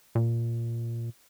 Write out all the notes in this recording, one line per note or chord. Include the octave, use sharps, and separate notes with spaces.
A#2